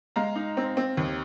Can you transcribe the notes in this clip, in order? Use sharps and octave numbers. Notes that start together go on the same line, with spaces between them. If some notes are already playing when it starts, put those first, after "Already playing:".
G#3 F5 A#5
D#4
C4
C4
D#2